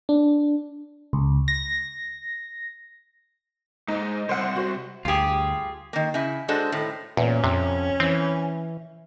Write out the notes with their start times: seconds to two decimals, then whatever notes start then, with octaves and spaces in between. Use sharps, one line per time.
0.09 D4
1.13 C#2
1.48 A#6
3.88 G#2 D#4
4.29 C2 C5 F#5
4.56 F#4 C5
5.05 D2 G2 F4 G4 G#4
5.93 D#3 A#3
6.14 C#3 E4
6.48 G#3 D4 F#4 A4 C5
6.72 A2 D#3
7.17 E2 A#2 C#4
7.44 F2 C3
8.00 E3 C4